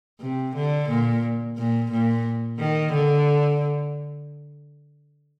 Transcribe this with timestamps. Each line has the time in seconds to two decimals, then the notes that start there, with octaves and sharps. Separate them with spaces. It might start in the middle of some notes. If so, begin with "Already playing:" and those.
0.20 C3
0.56 D3
0.89 A#2
1.58 A#2
1.91 A#2
2.58 D#3
2.93 D3